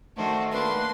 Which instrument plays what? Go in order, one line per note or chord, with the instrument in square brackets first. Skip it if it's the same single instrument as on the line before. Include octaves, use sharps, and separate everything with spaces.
[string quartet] D#3 F#4 [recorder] A3 [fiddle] D4 C5
[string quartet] A#3 C6 [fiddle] D4 [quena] B4